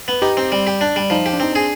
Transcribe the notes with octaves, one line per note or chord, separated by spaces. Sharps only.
B3
D#4 G4
C4
G3
G4
D4
G3
F3 D#4
G4
D4
C4 D#4
D4 G#4